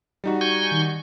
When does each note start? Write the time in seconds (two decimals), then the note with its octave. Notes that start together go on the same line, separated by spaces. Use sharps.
0.24 G3 D#4 F#4
0.41 G#5 C#6 G6
0.72 D#3